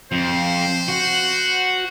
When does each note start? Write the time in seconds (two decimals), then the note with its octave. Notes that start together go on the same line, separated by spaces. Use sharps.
0.12 F2 C5
0.88 F#4